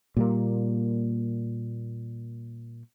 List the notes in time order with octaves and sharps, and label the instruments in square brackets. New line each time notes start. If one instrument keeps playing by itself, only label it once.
[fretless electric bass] A#2 G3 A#3